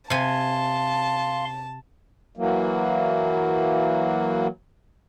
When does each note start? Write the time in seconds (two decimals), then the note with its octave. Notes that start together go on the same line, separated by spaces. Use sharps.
0.10 C3 F5 G#5 A5 C6
2.35 E3 F#3 A#3